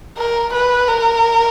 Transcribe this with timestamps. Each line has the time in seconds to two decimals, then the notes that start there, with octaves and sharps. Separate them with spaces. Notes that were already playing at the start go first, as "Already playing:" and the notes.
0.18 A#4
0.53 B4
0.89 A#4